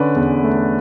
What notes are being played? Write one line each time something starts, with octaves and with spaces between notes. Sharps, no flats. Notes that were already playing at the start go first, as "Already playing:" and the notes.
Already playing: D3 C#4 B4 D5
E2
A3